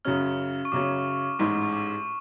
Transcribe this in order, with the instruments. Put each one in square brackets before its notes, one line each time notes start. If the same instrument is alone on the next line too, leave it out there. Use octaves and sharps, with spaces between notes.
[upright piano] F#2 C#3 F#3 C#4 [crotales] F6
[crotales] C#6
[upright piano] F#2 C#3 F#3 C#4 [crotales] D6
[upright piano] A1 G#2 G#3 [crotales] C#6
[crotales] C#6
D6